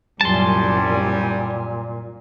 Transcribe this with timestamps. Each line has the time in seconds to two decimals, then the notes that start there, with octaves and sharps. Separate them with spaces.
0.21 C2 F#2 A#2 G3 G#5 A5 C6